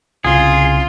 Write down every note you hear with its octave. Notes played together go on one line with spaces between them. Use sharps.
C2 C#3 F4 G#4